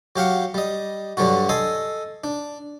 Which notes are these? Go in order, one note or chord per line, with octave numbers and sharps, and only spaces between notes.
F#3 G4 F5 F#5
G3 D#5
G2 D3 F#3 G3 F#4
A4 D#5 G#5 C6
D4